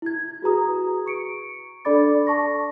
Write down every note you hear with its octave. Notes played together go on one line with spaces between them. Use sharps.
E4 G#6
F#4 G#4 B4 A#5 D#6
C#6 C#7 D7
D4 A4 D5 B5 D6 A6
A5 C#6 A#6